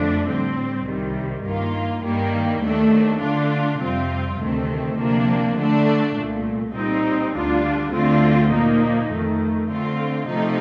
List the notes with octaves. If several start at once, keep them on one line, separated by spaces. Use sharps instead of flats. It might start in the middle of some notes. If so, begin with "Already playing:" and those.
Already playing: F2 D3 F3 A3 D4
A2 G3 C4
C2 C3 D#3 G3
G2 D#3 A#3 F4
G2 D#3 G3 A#3
D#2 D#3 A3 D4
D3 A3 D4 F4
F2 C3 G3 C4 F4
D2 C3 D#3 A3 C4
C3 F3 A#3 D4
D3 A3 D4
C2 A#2 A3
A#2 G3 C4 D#4
D2 D3 G3 D4 F4
D2 D3 A3 C4 F4
A#2 F3 A#3 D#4
F2 D#3 A3
D3 A3 C4 F4
C3 F3 A3 D#4